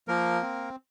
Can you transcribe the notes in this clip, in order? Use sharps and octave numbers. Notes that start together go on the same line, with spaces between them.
F3 A#3 A#4
C4